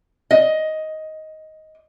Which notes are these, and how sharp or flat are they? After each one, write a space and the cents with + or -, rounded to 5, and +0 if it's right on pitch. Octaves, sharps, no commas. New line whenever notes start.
D#5 +10